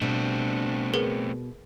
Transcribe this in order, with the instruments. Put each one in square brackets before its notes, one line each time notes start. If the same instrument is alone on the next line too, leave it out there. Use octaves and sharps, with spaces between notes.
[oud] B2 G3 [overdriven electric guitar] A3 C4 [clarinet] D4
[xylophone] G#4 A#4 B4